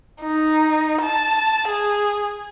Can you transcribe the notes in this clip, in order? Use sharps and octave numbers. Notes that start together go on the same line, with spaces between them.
D#4
A5
G#4